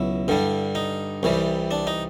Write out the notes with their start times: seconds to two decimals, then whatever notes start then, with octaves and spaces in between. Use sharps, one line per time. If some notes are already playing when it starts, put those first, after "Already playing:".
Already playing: C#2 B2 F#3 E4
0.28 G2 D3 G3
0.75 D#4
1.23 C2 C3 E3 G3
1.71 D4
1.87 D#4